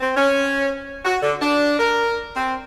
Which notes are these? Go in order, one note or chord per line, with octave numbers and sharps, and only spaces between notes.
C4
C#4
F#4
D3
D4
A#4
C4